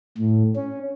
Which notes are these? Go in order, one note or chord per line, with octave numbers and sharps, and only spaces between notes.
A2
C#4